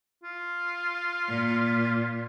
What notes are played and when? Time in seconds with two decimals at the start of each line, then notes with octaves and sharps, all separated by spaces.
0.23 F4
1.28 A#2